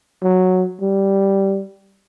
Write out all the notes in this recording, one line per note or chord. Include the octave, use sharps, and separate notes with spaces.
F#3
G3